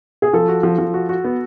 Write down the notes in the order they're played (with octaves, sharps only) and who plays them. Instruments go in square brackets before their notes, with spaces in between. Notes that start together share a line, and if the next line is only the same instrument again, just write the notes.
[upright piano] G#4
[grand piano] F3 [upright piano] A4
[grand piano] F#4
F3
F3
F#4
F#4
B3